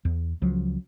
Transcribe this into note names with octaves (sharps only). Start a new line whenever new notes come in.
E2
C#2 F3 F#3